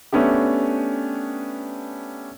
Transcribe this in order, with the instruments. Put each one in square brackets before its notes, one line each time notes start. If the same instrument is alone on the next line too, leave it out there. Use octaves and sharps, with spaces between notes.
[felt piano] A3 B3 C#4 D4 G4